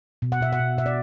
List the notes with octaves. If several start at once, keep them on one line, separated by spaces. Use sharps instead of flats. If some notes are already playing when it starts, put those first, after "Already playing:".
B2
F#5
B2 E5
F#5
B2
B2 E5
D5